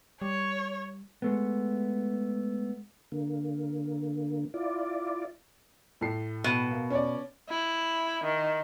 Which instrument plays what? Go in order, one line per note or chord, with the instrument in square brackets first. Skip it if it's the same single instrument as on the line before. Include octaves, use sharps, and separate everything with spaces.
[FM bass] G3 [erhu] C#5
[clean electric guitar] G#3 A3 B3
[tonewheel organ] D3 A#3
E4 F4 D5
[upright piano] A2 A4 C7
[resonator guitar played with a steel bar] B2
[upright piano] A#3
C#4 C#5 D5
[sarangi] E4
D#3